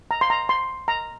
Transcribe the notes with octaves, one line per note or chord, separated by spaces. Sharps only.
A#5
C6
A#5
C6
A#5